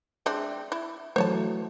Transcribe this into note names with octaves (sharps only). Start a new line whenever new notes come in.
G#3 C4 D4 E5
E4
E3 F#3 A3 C5 C#5 A5